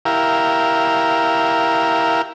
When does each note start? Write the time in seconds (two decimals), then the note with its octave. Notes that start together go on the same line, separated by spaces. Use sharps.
0.05 E4 G4 A#4 F5